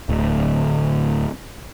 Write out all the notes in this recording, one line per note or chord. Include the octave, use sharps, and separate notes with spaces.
D1 D2